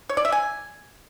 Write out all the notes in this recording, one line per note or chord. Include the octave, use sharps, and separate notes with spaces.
C#5
D5
E5
G#5